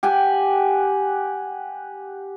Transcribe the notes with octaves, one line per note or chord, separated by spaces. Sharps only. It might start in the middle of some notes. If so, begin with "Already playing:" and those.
G4 F#5 G#5